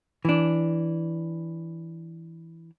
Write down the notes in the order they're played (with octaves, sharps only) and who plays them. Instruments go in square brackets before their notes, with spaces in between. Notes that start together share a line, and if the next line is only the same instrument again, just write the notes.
[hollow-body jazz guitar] E3 D4